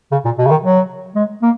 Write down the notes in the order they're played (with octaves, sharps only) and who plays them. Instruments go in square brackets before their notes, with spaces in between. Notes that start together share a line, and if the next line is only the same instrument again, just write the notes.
[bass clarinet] C#3
A#2
B2
C#3
D#3
F#3
G#3
A#3